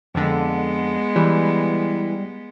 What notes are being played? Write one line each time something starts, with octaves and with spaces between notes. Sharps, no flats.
F2 D3 G#3 B3
E3 G3